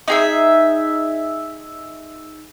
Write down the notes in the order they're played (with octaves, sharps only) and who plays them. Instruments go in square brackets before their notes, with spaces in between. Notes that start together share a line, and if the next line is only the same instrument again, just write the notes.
[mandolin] D#4 G#4 E5